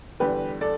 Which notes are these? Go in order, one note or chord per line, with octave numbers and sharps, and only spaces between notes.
E2 D3 G3 G4 B4
A4 D5